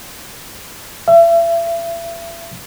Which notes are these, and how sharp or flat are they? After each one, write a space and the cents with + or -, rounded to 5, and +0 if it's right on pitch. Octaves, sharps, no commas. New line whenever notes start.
E5 +35